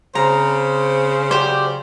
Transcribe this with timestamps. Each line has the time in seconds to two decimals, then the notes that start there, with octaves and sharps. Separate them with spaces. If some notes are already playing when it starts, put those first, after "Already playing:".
0.15 C#3 C4 C5 A#5
1.31 C#3 F#3 G4 C5 D5